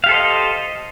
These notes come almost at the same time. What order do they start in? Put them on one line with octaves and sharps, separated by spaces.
F5 G4 A4 C5 D#5